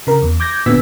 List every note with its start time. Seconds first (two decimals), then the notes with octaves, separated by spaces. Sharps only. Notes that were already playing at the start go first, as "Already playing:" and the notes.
0.07 C#3 A#4
0.22 E2
0.40 D6 G6 G#6 A#6
0.66 A1 A#2 D3 B3 E6 B6